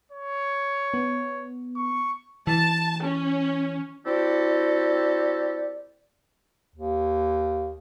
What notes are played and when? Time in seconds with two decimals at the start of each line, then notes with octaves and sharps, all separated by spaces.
0.11 C#5
0.94 B3
1.76 C#6
2.47 E3 A5
3.03 C#4
4.05 C4 E4 F#4 G4 A4 D5
6.76 D#2